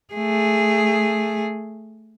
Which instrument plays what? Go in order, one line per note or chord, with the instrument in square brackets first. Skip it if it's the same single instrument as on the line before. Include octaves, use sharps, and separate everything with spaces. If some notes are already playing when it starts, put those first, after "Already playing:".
[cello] A3 G#4